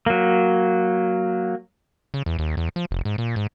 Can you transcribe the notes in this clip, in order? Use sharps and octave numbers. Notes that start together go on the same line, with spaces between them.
F#3 A#3
C#3
E2
D#2
E2
F3
F1
G#2
A#2
G#2